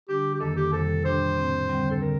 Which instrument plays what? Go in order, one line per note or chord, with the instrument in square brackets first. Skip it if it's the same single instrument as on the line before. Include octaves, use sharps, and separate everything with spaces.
[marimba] D3 G3 D4 [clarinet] G4
[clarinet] G4
[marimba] F2 D#3 A#3 [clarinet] A4
[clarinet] G4
[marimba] F2 C3 D#3 G3 [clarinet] A4
[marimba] A#2 G3 D4 G4 [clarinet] C5
[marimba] A2 A3 C4
D2 D3 G3 C4
[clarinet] A4
[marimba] D3 [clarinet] A#4